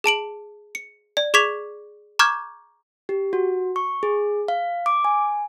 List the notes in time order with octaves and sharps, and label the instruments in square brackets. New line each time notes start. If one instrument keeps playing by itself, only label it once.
[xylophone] G#4 A5 D7 F#7
C#7
D5
G#4 C#6 D6 G#6 B6 F7
A#5 C#6 D6 F6 G6 G#6
[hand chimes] G4
F#4
C#6
G#4
F5
D6
G#5